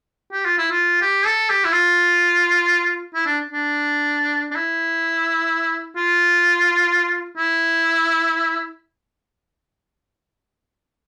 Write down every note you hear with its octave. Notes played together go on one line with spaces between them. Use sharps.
G4
F4
E4
F4
G4
A4
G4
E4
F4
E4
D4
D4
D4
E4
F4
E4